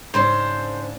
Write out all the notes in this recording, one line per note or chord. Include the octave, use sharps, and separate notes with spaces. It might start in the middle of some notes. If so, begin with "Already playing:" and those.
G#2 C#3 D4 C5